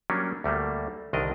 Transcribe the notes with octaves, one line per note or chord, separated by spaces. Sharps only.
F#3 G3 A#3 C#4 D4
D2 G3 A3 A#3
C2 D3 D#3 D4 A#4 D#5